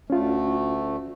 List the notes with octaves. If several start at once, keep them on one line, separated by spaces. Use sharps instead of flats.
D2 A3 C#4 F4